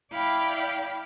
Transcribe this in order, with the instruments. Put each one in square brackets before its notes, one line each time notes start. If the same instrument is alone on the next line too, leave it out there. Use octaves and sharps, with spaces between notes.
[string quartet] E4 D5 F5 G5 B5